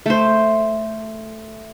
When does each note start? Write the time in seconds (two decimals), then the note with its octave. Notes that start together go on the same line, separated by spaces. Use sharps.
0.06 A3 C5